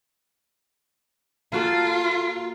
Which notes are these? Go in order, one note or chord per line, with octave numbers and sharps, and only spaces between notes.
A#3 F4 F#4 A4